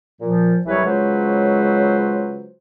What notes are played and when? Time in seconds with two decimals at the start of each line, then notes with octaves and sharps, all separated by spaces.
0.21 A#2 F3
0.66 C2 E3 F#3 G3 B4 C#5
0.85 C#3 F#3 G#3 F4 B4 C5